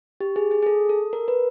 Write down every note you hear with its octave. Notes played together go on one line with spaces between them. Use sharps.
G4
G#4
G#4
G#4
A4
A4
A#4
B4